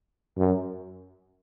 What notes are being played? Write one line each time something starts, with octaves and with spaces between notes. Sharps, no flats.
F#2